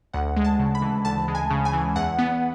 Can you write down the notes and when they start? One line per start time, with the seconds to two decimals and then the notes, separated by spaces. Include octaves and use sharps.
0.13 D2 F#5
0.37 G#3
0.44 A5
0.59 C#3
0.75 B5
0.82 E3
1.05 D2 A5
1.28 G#3
1.35 G#5
1.51 C#3
1.65 G#5
1.73 E3
1.96 E2 F#5
2.19 B3